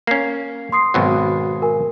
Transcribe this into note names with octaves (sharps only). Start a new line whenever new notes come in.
A#3 C#4 C7
C6 D#6 C7
G#1 B2 F#3
A#4 G#5